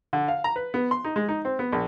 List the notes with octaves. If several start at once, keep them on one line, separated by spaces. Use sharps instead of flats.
D3
F5
A#5
B4
B3
C6
D#4
G#3
D#4
C4
B3
A#1